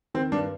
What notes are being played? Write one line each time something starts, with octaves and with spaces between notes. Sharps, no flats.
D#3 C4
G2 D4